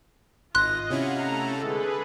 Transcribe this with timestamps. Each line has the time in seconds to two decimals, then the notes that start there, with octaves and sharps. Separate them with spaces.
0.55 G#1 F4 D#5 C6 F#6 A#6
0.90 C3 C#4 E4 F5 F#5
1.21 A3 A4 A#5
1.60 D3 G#3 G#4 A4 B4